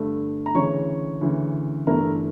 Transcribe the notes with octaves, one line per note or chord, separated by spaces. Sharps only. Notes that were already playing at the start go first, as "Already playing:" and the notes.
Already playing: G2 D3 A3
A#5
D2 C#3 E3 C#5 C#6
D2 C#3 E3
G1 G2 E3 A3 E4 A#4 A#5